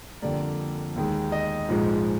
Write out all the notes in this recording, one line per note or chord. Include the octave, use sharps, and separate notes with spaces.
F2 D3 G3 A#3 D5
D#2 D#3 G#3
D#5
A#1 G#2 F3 G#3